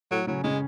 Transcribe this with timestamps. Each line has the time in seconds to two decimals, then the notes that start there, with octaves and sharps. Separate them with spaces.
0.11 A2 F#3 A3
0.27 C#3 F#3 C#4
0.43 C#3 G#3 C#4